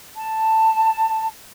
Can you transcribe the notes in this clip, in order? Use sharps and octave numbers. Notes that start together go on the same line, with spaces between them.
A5